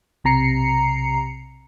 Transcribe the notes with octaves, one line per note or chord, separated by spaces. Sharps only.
B1 C3 A#5 C7 C#7